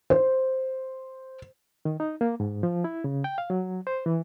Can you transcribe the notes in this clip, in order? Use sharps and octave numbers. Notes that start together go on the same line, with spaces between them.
C5
D#3
D#4
A#3
G#2
F3
E4
C#3
G5
F5
F#3
C5
E3